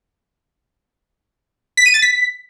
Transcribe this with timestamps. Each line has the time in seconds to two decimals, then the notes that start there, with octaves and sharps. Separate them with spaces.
1.77 B6
1.86 D#7
1.94 A6
2.02 B6